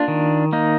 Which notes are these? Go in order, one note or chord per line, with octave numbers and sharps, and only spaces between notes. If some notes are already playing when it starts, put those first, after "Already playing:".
Already playing: A#3 D4 F4
D#3
A#3 D#4